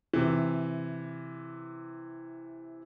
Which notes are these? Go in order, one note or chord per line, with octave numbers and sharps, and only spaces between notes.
C3 E3